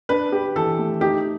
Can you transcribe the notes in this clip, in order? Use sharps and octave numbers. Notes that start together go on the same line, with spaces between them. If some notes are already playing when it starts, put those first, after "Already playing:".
D4 B4
G4
E3 A4
A3
D#4 G4